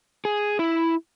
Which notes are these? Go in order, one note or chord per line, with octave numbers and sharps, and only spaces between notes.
G#4
E4